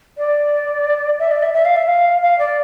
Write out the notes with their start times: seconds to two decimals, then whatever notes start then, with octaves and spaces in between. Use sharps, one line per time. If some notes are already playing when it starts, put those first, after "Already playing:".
0.18 D5
1.19 E5
1.31 D5
1.43 E5
1.54 E5
1.65 F5
1.76 E5
1.88 F5
2.22 F5
2.39 D5